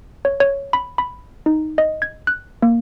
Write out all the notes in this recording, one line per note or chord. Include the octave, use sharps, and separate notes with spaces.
C#5
C#5
B5
B5
D#4
D#5
G#6
F#6
A#3